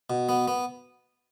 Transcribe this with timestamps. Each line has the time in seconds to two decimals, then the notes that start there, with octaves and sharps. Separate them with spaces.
0.10 B2
0.29 B3
0.48 B3